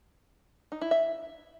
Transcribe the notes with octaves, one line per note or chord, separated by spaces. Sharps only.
D#4
E4
E5